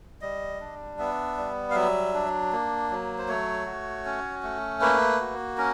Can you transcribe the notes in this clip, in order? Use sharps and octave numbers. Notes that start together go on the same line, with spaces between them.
G3 D#5
D4
B3 E5
G3
F5
F#3 E5
D4
A#3
F#3
C5
A3 C#5
F#4
C#4
A3
A#3 B4
F#4
C#4 A#4